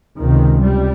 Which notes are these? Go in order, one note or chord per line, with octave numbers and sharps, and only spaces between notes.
C#2 C3 D#3
G3